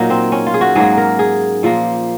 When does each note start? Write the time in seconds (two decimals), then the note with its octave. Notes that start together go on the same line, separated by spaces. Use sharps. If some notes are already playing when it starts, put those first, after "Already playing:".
Already playing: A#2 F#3 A#3 D#4
0.10 C4
0.32 C#4
0.47 F4
0.54 G#4
0.61 F#4
0.75 G#2 F#3 A#3 G#4
0.97 A#4
1.19 G#4
1.63 A#2 F3 A#3